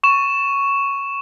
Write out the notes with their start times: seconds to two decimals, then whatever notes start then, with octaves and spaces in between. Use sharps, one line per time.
0.03 C#6 E7